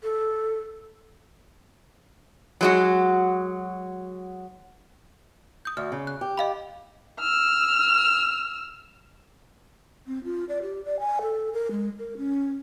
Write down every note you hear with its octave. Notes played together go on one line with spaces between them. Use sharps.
A4
F#3 G#3 F#4
D#6 G6
D2 F6
C#3
F#6
G4
D#5 F5 B5
E6 F6
C4
F4
D5
G4
D5
G#5
A4
A#4
G#3
A#4
C#4